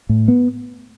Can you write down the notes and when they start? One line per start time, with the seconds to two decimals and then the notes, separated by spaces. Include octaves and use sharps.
0.09 A2
0.28 B3